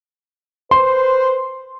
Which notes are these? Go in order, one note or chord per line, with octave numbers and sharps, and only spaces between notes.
B4 C5 C6